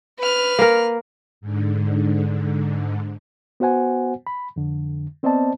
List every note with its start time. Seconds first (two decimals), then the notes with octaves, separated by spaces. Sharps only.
0.19 B4 F6
0.59 A#3 A#4
1.41 G#2 D3
3.60 B3 F#4 C5 F#5 G#5
4.27 B5
4.56 F2 D3
5.23 B3 C4 C5 D5 D#5 A5